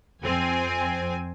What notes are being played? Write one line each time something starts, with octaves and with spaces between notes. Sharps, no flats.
F2 C4 G#5